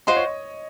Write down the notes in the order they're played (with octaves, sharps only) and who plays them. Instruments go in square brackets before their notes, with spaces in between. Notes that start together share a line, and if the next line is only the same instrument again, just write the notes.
[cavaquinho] F4 C5 F#5 C6 [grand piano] D#5
[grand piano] C#5